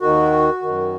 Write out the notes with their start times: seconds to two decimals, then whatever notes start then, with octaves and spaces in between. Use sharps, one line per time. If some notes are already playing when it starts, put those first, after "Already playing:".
0.01 D#2 D#3 F#4
0.62 F#2 D#3